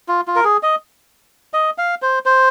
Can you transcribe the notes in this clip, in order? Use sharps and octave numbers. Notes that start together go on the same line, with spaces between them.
F4
F4
A#4
G#4
D#5
D#5
F5
C5
C5